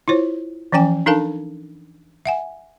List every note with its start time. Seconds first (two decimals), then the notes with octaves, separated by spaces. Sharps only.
0.08 E4 F4 C5 C#5
0.72 E3 F3 C#4 G5 G#5
1.06 D4 D#4 A4 A#4 F5 A5
2.26 E5 F#5 G#5